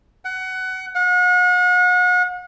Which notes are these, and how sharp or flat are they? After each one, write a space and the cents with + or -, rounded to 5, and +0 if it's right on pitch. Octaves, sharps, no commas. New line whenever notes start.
F#5 +20
F#5 -40